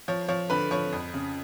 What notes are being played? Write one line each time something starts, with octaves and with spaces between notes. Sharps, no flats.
F3 C#5
F3 C#5
D3 B4 B5
F3 C#5 C#6
F2
C#3